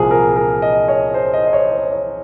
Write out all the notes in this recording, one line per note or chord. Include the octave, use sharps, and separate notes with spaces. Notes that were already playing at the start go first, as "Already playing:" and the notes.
Already playing: C2 A#2 F3 G#4
A#4
A#4
D#5
C#5
C5
D#5
C5
C#5
C5
C#5